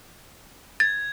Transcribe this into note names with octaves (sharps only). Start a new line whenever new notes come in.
G#6 A6